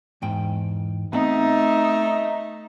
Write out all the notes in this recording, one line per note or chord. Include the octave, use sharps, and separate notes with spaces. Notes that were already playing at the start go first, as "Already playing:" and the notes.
E2 G#2 G5
A3 B3 C4 D#4